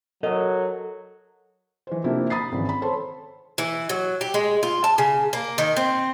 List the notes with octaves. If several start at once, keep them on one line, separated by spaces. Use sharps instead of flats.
F#3 A4 A#4 D#5
E3 C5
C3 F3 A#3 D4 E4
A#5 B5 D#6 A6 C7
G#1 C#3 E3
B5
A4 C5 C#5 A5 C6
E3
F#3
G4
G#3
F4
A5
C#3
A#3
D#3
C4